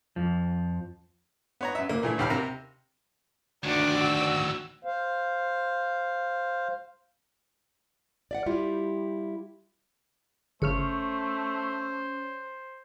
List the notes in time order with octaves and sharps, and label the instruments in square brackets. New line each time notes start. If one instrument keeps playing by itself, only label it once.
[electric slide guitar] F2 F3
[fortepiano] B3 C#5 A#5
F#2 E5
D2 A#3
A#2 E3 A3
A#1 D#2 G4 B5 F6
C3 G4 A#4 A#5
[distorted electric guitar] D2 D#3 [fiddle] D4 D5 [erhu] F#4
[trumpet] F#4 [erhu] E6
[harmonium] C5 F5
[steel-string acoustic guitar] D5 E5 F#5
G3 E4 F4 G4
[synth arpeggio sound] G1 C#3 F6 [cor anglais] A3 [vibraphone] C#4 C#5 [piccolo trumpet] C5